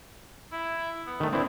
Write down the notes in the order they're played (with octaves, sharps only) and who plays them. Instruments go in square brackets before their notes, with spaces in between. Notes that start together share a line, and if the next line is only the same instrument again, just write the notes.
[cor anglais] E4
B3
[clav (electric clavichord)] D#3 A3
[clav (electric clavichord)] C4 D4 E4 [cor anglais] B4